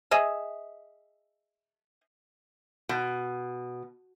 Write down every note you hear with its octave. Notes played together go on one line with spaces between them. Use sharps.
G#4 D#5 E5
B2